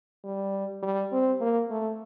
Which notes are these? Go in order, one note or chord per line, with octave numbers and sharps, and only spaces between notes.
G3
G3
C4
A#3
A3